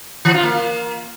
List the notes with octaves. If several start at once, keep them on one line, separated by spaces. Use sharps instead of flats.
E3
F4
A#3